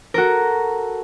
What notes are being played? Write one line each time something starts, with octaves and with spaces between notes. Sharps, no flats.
F#4 A4 A#4